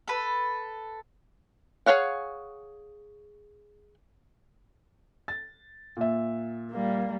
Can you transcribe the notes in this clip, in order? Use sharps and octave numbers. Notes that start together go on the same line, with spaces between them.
A4 B4
G#4 A4 C#5 F5 F#5
A6
A#2 E5
G3 A#3